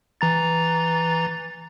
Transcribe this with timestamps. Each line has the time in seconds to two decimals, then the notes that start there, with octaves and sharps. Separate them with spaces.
0.21 E3 A#5 A6